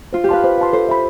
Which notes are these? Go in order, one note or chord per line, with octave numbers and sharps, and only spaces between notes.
F4 C5
G4
B4 F5 A5 C6
C5
F5 A5 C6
A4 C5
E5 B5